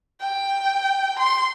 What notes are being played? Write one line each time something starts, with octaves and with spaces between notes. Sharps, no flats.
G5
C6